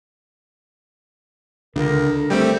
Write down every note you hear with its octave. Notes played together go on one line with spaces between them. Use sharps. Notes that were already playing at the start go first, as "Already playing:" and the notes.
C#2 D3 A#4
G3 A3 C4 G5